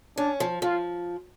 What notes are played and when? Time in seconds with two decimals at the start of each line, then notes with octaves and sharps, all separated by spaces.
0.17 C#4 D4
0.40 F3
0.62 F3 F4